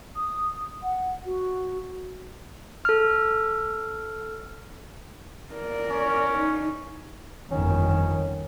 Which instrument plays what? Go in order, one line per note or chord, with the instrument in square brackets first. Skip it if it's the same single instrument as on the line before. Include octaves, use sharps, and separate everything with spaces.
[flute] D#6
F#5
F#4
[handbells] A4 F6
[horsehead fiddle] A#4 D5
[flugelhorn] C#4
[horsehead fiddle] D#4
[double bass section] G1 F2 D#3 [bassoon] C#4